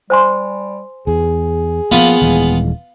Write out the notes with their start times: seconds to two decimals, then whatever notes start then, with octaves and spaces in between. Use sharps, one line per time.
0.10 G3 C5 G#5 C6
1.07 E2 G#4
1.91 F3 A#3 B3 F4 B4 F5
2.22 D#1 E3 G#3